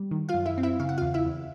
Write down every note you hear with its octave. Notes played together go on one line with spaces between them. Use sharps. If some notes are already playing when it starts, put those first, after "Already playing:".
Already playing: G3
D#3
F4 F5
F#2
E4 E5
C4
E4 E5
C#3 F5
F#5
F4 F5
E2
E4 E5
E2